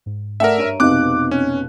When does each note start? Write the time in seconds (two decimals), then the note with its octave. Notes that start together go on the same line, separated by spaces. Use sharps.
0.06 G#2
0.40 A3 A#4 D5 E5 F#5
0.58 G2 C#5 A#5 D7 D#7
0.80 F1 B2 C4 D#4 D#5 F5 D6 F#6
1.31 C#4